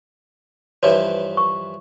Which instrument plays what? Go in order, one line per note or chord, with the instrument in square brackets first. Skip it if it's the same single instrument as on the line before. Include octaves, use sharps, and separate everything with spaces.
[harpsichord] G2 E3 F3 [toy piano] C#5
[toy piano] C#6